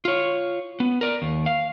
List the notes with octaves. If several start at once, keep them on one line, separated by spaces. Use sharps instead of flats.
F4 C#5
B3
A#4 D5
D#2
F5